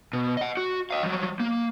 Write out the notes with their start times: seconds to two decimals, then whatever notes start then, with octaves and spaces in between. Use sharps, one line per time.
0.13 B2
0.37 D#5 F#5
0.57 F#4
0.91 D#5 F5
1.03 F3 F#3
1.40 A#3